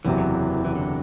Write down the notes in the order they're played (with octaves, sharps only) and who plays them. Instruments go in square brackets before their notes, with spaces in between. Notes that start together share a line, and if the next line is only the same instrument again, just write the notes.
[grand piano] F#1 E2 C3 F#3 [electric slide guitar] E3
[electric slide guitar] E3
D3